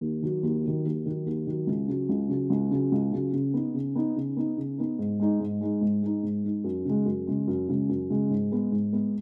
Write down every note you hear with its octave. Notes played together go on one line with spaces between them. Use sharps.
D#2
D#3 F#3
D#2
D#3 F#3
D#2
D#3 F#3
D#2
D#3 F#3
C#2
C#3 F#3
C#2
C#3 F#3
C#2
C#3 F#3
C#2
C#3 F#3
C#3
B3 D#4
C#3
B3 D#4
C#3
B3 D#4
C#3
B3 D#4
G#2
G#3 D#4
G#2
G#3 D#4
G#2
G#3 D#4
G#2
G#3 D#4
F#2
C#3 G#3
F#2
C#3 G#3
F#2
C#3 G#3
F#2
C#3 G#3
G#2
G#3 B3
G#2
G#3 B3